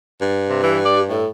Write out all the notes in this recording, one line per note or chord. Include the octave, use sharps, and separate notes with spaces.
G2
C3
E3 G4
D5
A2 A4